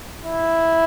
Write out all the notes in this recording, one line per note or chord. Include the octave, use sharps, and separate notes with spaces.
E4